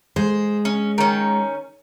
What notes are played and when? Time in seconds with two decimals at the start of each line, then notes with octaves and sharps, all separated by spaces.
0.16 G#3 C5
0.65 C#4
0.98 D#3 C#4